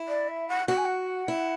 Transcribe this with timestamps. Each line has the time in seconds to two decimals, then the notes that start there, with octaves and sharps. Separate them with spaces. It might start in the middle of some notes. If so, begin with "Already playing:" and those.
Already playing: E4
0.08 D5
0.28 E5
0.48 F#5
0.68 F#4 F#5
0.77 G#5
0.85 F#5
1.28 E4